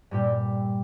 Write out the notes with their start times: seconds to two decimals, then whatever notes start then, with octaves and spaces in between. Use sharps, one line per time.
0.11 G2 A#2 G4